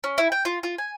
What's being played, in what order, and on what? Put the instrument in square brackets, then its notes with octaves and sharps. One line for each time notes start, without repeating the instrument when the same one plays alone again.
[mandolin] C#4
E4
G5
F4
F4
G#5